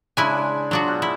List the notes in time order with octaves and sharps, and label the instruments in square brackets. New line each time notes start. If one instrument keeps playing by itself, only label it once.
[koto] C#3 E4 G#5 [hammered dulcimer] G#3 D4
[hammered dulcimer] G#3 C5
[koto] F#3 D4 F#4 [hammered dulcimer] F4 G#4
[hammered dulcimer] B2
[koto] E4